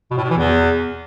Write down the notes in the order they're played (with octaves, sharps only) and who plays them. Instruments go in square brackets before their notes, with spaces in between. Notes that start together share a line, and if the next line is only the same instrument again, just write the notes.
[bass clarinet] B2
A2
B2
E3
E2